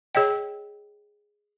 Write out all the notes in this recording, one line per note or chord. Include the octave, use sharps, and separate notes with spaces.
G#4 C#5 D#5 G5